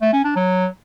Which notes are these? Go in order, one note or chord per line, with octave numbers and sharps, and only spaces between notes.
A3
C#4
D4
F#3